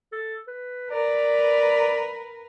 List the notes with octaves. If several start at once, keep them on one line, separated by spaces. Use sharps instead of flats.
A4
B4
A#4 B4 D5